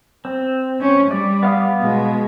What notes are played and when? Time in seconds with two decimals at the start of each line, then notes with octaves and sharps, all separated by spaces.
0.25 C4
0.81 C#4
1.11 G3 D5
1.43 B3 F5 D#6
1.80 B2 G#3